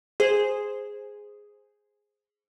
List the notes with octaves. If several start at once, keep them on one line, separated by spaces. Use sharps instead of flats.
G#4 C5